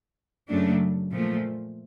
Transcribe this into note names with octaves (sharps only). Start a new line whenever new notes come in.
F#2 C#3 F#3 A3 D4
A#2 F3 A3